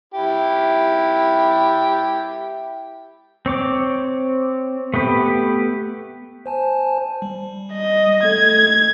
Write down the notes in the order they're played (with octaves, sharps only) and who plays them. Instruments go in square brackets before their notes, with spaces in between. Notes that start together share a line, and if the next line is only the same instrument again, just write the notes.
[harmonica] E4 G4
[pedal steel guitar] C4 C#5 D6
A3 B3 G4 B4
[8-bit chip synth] C5 G#5 A5
G3
[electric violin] D#5
[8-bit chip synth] A3 A4 [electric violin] G#6